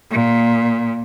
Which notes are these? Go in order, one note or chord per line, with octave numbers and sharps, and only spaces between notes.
A#2